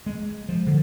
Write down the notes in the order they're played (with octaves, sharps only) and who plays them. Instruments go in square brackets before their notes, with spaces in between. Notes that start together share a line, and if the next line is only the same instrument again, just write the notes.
[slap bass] G#3
F3
D3